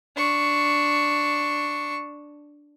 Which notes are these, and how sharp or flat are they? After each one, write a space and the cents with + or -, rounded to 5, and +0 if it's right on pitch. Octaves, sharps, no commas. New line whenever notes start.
D4 +0 C#6 +0